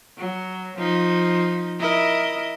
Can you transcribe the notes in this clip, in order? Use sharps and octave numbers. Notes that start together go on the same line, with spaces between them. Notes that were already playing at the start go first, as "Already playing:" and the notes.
F#3
F3 D#4
E4 A#4 D#5